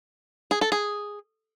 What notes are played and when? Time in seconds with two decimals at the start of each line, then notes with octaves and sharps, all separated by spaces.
0.51 G#4
0.61 A4
0.72 G#4